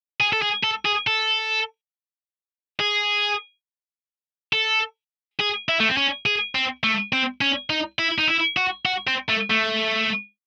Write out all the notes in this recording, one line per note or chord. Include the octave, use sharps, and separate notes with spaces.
G#4
A4
G#4
A4
G#4
A4
G#4
A4
G#4
E4
A3
C4
C#4
G#4
C4
A3
C4
C#4
D#4
E4
D#4
E4
F#4
F#4
C4
A3
A3